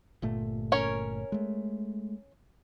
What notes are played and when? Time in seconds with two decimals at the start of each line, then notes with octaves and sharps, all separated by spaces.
0.22 G1 A#2 A3
0.72 C#4 A#4 C#5
1.32 G#3 A3